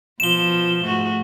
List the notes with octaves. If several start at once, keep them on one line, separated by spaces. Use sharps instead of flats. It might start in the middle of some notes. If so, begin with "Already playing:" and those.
B2 F3 E7 G7
G#2 A3 F#4